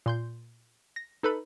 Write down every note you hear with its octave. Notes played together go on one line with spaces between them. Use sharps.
A#2 C6 G6
A#6
D#4 A4 B4 B5